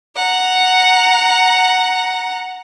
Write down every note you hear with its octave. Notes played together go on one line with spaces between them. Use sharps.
F#5 A#5